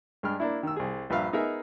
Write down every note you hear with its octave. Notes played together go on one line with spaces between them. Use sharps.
G2 G#3 D4 G5 B5 F6
A#3 D4 E4
D#3 E6
C2 G#4
A#1 G2 B4 E5 F5 F6
B3 D#4 G#4 A#4 E5